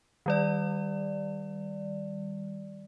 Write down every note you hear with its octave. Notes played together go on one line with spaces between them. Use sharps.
D#3 G3 D5